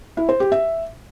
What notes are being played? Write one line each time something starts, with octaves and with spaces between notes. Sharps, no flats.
E4
C5
G4
E5